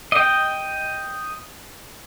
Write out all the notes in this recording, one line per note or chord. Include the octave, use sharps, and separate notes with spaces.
D#5 G5